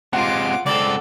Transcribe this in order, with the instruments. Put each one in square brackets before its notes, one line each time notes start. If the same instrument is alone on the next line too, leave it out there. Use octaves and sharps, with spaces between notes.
[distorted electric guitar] C3 G#3 [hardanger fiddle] F4 D6 [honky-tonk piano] F#5
[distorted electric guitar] C#2 C4 [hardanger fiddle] A4 [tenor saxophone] D5